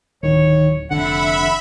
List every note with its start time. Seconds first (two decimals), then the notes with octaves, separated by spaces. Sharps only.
0.23 D1 D#3 C#5
0.91 F1 D3 E5 F#5 B5